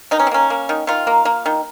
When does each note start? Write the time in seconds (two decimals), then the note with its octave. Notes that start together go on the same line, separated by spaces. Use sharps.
0.11 D#3 D#4
0.20 C#4
0.27 C4
0.31 A#3 C#4
0.50 A#3
0.69 D#3
0.87 D#3 F4
1.07 A#3
1.25 A#3
1.46 D#3